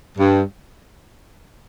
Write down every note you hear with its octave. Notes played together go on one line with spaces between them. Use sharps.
G2